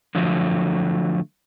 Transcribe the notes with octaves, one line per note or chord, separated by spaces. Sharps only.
D3 F3 F#3 A3